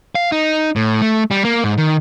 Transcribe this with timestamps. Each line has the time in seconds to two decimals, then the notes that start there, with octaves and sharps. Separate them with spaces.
0.15 F5
0.32 D#4
0.76 A2
1.02 A3
1.31 G3
1.45 A#3
1.64 G#2
1.78 D#3